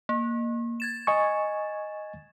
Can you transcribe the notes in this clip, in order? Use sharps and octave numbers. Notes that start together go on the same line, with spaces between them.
A#3
G#6 A6 E7
D#5 G#5 C#6